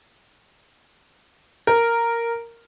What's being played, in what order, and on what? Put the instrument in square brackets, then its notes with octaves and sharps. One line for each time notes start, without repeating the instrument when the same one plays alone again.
[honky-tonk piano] A#4